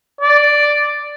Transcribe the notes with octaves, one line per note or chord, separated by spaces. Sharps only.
D5